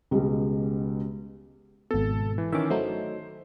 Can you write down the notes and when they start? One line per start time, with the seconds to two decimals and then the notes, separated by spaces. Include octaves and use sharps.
0.11 C#2 B2 G3 G#3
1.91 G#1 B2 A4
2.38 E3
2.52 D#3 E3 C#4 E5 D6
2.70 F#3 A3 D#4 C5